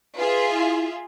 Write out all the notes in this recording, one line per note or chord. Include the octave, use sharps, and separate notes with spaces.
F4 G#4 B4 E5
E4